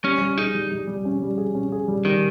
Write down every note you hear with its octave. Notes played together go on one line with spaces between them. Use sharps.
G3 C#4
G3
D#4 G#4
G3
G3
G3
C#4
G3
G#4
C#4
G#4
G3
D#3 G3